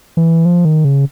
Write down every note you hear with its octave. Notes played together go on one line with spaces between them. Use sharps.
E3
F3
D#3
C#3